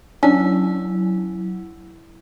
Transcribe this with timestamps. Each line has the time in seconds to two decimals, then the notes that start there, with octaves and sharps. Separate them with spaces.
0.23 F#3 C#4 D4 E4